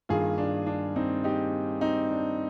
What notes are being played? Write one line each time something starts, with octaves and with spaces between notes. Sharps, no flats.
G2 D#3 A#3 F4 G#4
D4
D4
C4 D#4
D#4 G4
C4 D#4
D4